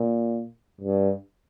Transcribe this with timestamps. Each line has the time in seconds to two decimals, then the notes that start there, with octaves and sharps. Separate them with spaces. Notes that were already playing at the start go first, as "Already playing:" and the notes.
Already playing: A#2
0.81 G2